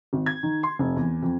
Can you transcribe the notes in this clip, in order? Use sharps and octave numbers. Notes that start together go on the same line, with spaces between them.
G#1
G#6
D#3
C6
F1
E2
F2